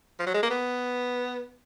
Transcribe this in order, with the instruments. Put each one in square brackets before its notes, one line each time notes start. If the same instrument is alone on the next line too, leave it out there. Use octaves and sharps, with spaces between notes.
[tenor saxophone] F3
F#3
G#3
A#3
B3